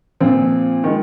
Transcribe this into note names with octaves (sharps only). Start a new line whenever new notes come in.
A#2 F3 C4
D#3 G#3